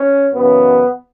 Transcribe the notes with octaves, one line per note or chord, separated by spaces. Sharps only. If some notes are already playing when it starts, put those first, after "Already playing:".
Already playing: C#4
F#2 C#3 E3 B3